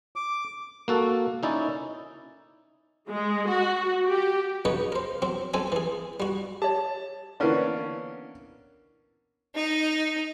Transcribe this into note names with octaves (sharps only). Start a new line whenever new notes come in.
D6
A#3 F#4 A4
C#4 D#4 E4 D5
G#3
F#4
G4
C#3 F#3 D#4 B4 C#5
A#4 C5
F#3 C4
F#2 C4 A4 G#5
E3 G#4
G3 F#4
G4 C#5 A5
E3 A#3 B3 C#4 D4
D#4